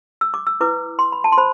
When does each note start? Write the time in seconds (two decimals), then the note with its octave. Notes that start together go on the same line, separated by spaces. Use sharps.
0.21 E6
0.34 D6
0.47 E6
0.60 E4 B4 D6
0.99 C6
1.12 B5
1.24 A5
1.32 C6
1.38 C5 B5